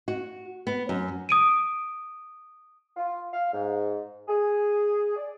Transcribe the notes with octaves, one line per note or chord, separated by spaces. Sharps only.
F#4
B3
F#2
D#6 D7 D#7
F4
F5
G#2
G#4
D5